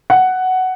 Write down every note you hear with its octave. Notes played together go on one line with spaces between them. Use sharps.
F#5